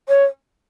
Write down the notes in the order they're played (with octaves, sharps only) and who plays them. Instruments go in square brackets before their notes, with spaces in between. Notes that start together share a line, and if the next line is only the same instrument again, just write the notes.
[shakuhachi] C#5